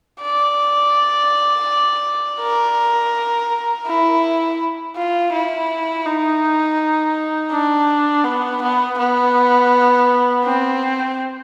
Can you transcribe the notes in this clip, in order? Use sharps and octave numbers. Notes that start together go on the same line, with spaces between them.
D5
A#4
E4
F4
E4
D#4
D4
B3
B3
B3
C4